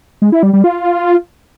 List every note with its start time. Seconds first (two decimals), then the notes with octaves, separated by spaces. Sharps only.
0.22 G#3
0.32 E4
0.43 G3
0.53 G3
0.64 F4